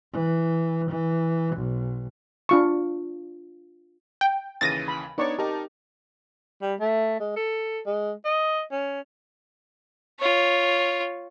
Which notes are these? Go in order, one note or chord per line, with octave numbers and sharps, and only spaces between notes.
E3
E3
B1
D4 F4 C#6
G5
D#2 C#3 E3 A6 A#6 D#7
B5
B3 D4 D#4 C#5 D5 C#6
D#4 G4 A#4 A5
G3
A3
G#3
A4
G#3
D#5
C#4
F4 C#5